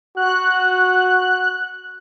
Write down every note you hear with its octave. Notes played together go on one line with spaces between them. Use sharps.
F#4 F#6